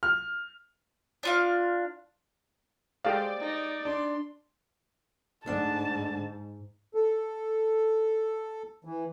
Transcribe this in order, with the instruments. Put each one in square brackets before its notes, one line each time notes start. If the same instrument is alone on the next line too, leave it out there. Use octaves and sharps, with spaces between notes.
[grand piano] F6
[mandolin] D4 F4 F5
[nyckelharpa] G#3 C5 [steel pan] G4 A4 F5 [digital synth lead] D5
[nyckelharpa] D#4
[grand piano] D4 [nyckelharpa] C6
[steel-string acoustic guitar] D2 D4 F#5 [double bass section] G#2 [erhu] A5
[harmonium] A4
E3